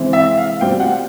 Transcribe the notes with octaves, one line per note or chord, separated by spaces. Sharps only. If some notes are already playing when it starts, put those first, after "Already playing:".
Already playing: C3 E3 G#3 C4
E5
F5
B2 G3 C4 F4 G5
F#5